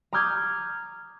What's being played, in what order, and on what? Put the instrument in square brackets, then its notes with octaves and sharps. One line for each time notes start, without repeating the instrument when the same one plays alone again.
[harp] A#5 D6 D#6 F6 G6 G#6